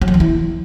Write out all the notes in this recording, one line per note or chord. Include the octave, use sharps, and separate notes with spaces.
F#3
D3
E3
E4